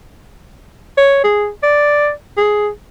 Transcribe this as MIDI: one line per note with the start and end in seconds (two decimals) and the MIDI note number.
0.97 1.20 73
1.24 1.49 68
1.63 2.11 74
2.37 2.69 68